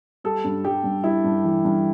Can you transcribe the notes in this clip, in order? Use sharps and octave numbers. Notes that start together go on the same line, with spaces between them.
G3 A4
G2
G3 G4
G2
G3 E4
G2
E3
G2